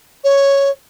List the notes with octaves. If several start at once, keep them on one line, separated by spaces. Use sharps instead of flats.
C#5